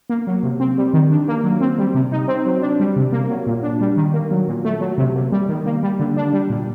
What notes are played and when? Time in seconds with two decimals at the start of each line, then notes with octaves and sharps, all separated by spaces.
0.10 A#3
0.27 F#3
0.43 C3
0.60 C4
0.77 G3
0.93 D#3
1.11 D4
1.28 A#3
1.44 F#3
1.61 C4
1.78 G3
1.94 C3
2.12 D#4
2.28 C4
2.46 F#3
2.62 D4
2.80 G3
2.96 C3
3.12 A#3
3.30 F#3
3.47 A#2
3.63 D4
3.81 G3
3.97 D#3
4.13 A#3
4.31 F#3
4.48 A#2
4.65 A3
4.81 F#3
4.98 C3
5.15 A#3
5.32 G3
5.49 D#3
5.66 A#3
5.83 G3
5.99 D3
6.17 D4
6.33 G3
6.50 A#2